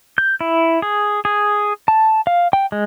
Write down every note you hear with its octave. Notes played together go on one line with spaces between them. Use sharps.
G6
E4
G#4
G#4
A5
F5
G5
G#3